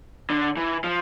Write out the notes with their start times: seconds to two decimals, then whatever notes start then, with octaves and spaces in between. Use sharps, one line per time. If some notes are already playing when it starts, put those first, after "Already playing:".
0.30 D3
0.57 E3
0.84 F3